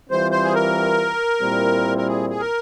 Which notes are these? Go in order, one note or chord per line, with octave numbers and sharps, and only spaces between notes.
E3 G3 C4 F4 C5
C5
G#4
A#4
A#2 G3 C4 E4
A#4
G#4
G#4
A#4